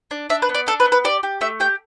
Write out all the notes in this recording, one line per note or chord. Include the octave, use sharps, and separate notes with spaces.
D4
D4 E5
B4
B3
D5
D4 A4
B4
B3
B4
G4 D5
G4
A3 E5
G4 G5